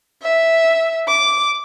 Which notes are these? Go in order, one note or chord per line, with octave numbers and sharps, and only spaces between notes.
E5
D6